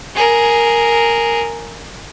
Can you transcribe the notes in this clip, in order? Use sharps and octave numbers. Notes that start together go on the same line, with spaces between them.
G#4 A#4